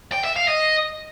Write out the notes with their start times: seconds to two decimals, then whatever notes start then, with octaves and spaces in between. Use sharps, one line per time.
0.12 G5
0.24 E5
0.36 F5
0.48 D#5